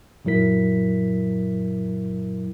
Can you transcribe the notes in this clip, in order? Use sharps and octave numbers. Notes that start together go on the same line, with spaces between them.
F#2 A#2 F#3 E4 A#4 B6